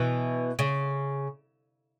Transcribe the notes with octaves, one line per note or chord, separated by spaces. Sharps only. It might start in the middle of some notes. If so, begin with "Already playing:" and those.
Already playing: B2 E3
C#3